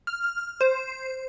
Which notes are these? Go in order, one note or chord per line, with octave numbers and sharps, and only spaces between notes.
F6
C5